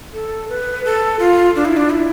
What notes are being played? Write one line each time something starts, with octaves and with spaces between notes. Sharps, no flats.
A4
B4
A4
F4
D4
E4
D4
E4